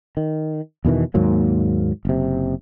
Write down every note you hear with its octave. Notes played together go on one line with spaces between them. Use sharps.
D#3
E2 B2 D#3 E3
D#2 G#2 F#3 A#3
F#1 C3